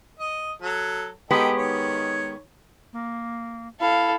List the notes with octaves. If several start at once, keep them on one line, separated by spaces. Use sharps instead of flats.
D#5
F#3 A4
G#3 B3 D#4 G4 A4 G5
D#3 C#5
A#3
E4 A4 F5